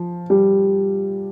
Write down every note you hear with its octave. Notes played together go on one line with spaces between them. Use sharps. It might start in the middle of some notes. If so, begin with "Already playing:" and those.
Already playing: F3
G3